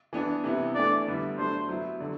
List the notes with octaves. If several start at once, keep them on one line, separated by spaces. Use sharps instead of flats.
E3 B3 D4
C3 E3 B3 E4
E3 A3 D4 D5
D3 G3 B3 E4
F#3 A3 D4 C5
F#3 B3 E4
D3 F#3